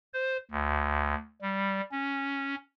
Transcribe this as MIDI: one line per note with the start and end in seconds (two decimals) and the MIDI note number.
0.14 0.37 72
0.51 1.15 38
1.42 1.81 55
1.92 2.55 61